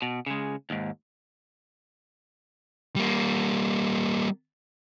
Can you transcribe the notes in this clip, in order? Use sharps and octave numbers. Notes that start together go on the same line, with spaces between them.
B2
C#3 G#3
D#2 G#2
G3 A#3